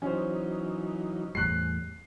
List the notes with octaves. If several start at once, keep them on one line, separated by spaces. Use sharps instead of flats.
E3 F#3 C#4 D#4 C5
E2 A2 G3 F#6 C7